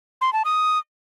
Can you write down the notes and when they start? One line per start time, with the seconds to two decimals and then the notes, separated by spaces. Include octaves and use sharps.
0.21 C6
0.33 A5
0.45 D#6